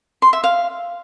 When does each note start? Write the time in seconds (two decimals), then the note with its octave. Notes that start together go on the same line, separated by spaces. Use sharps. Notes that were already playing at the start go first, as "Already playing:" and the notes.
0.22 C6
0.33 E5
0.44 F5